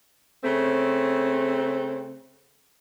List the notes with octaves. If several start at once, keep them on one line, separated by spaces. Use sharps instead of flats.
C#3 A3 C4